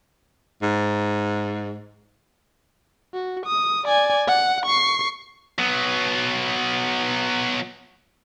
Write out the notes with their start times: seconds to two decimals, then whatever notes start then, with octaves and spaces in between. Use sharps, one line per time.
0.63 G#2
3.14 F#4
3.46 D#6
3.85 D5 G#5
4.27 F#5
4.66 C#6 C7
5.59 F#3 B3